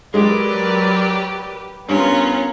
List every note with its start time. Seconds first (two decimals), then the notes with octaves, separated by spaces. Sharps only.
0.14 F#3 G#3 G4 A#4 B4 D5
1.89 G2 B3 C#4 F4 A#4